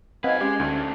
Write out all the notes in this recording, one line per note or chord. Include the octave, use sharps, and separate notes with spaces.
F#3 C4 B4 D#5 F5 F#5 G#5
G#3 C#4 G4
D2 D#3 A3